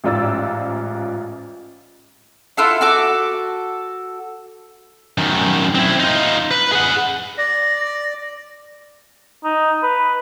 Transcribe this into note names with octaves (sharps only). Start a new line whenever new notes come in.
A1 G#2 F4 D5 E6 A6
E4 F4 A4 F#5
F#4 A4 D6
F#2 D#3
C4 E4
D#4 F4
B4
G#4 F#5
D5 A#6
D#4
B4